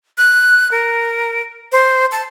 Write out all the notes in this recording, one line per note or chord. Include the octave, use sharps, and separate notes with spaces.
F#6
A#4
C5
A5